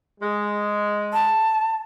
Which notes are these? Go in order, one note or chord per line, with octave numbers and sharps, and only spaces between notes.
G#3
A5